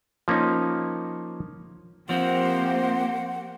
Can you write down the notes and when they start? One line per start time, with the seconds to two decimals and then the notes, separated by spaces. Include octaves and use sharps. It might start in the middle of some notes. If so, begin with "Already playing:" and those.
0.28 F3 A#3 C#4 D#4
2.09 F3 A#3 C4 G4 C5 F#5